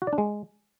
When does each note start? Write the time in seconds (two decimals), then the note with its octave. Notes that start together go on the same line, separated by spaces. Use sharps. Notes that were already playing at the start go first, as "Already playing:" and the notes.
0.02 F#4
0.07 D5
0.13 D4
0.18 G#3